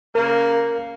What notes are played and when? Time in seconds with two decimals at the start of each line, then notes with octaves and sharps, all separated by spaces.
0.15 C#3 A#3 A#4